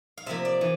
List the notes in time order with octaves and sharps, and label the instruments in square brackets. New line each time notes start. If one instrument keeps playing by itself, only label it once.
[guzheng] F5
C3 F3 A#3 E5
D5
E3